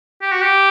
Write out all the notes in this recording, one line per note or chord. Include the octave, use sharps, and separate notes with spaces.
G4
F#4
G4